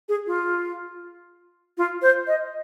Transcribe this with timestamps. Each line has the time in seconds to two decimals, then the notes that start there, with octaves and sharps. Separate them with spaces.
0.09 G#4
0.27 F4
1.78 F4
2.02 C5
2.27 D#5